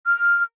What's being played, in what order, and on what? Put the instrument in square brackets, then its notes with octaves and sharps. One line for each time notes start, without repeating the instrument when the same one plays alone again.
[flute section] F6